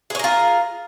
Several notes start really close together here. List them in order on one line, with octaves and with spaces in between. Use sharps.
G#4 C#5 A#4 F4